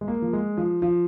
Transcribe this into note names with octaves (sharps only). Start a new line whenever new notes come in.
G#3
A#3
F3
G#3
F3
F3